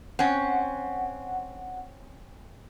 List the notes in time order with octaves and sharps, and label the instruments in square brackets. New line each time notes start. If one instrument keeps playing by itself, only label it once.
[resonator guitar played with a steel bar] C4 C#4 [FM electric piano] F#5